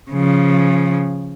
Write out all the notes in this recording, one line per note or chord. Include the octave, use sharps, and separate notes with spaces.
C#3 F3